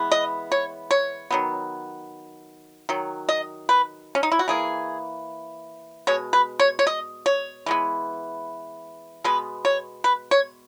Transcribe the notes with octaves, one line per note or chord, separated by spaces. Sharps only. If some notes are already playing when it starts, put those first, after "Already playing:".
Already playing: E3 G#3 B3
D#5
C#5
C#5
D#3 F#3 B3
D#3 F#3
D#5
B4
C#4
D#4
E4
F#4
E3 A#3 G#4
B2 G#3 C#5
B4
C#5
C#5
D#5
C#5
E3 G#3 B3
B2 G#3 B3 B4
C#5
B4
C#5